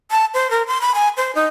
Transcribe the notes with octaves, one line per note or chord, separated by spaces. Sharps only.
A5
C5
A#4
C6
B5
G#5
C5
D#4